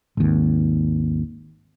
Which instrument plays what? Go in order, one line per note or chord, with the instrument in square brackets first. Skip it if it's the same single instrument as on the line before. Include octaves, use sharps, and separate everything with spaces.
[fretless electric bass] G#1 D#2